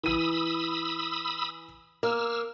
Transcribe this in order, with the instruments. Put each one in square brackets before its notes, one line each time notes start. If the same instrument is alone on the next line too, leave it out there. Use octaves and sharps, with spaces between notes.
[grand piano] E3 D#7 [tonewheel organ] B5 D#6 E6
[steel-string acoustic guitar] A#3 [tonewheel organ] E6 F6